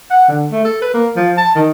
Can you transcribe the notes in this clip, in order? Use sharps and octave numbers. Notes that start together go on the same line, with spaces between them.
F#5
D3
A3
A4
B4
A#3
F3
A5
D#3